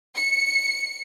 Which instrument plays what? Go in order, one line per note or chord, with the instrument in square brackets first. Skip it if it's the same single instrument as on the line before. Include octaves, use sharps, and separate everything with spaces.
[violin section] C#7